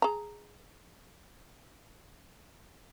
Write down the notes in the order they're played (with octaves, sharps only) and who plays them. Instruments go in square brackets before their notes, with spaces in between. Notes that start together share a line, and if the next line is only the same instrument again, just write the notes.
[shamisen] G#4 A#5